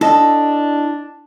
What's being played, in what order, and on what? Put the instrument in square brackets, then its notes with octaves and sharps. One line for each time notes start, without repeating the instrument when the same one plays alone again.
[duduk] D4 [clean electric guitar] E4 D#5 [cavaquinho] A4